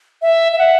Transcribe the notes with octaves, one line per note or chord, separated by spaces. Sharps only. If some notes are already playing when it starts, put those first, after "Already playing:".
E5
E5
F#5